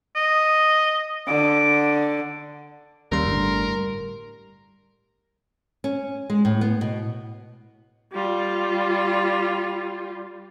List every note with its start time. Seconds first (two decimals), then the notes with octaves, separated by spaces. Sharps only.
0.16 D#5
1.28 D3 D6
3.12 D#2 C#3 G3 A#4 C6
3.25 G1 A2 D3
5.84 C#4
6.30 G#3
6.45 A2
6.61 B3
6.81 B2
8.13 G3 F4